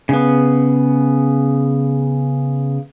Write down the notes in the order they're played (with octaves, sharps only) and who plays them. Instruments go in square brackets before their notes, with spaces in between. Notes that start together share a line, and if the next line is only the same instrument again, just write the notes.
[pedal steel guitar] C#3 B3